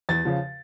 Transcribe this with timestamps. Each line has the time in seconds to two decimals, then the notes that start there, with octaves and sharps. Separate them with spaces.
0.09 E2 A6
0.25 C#3 F3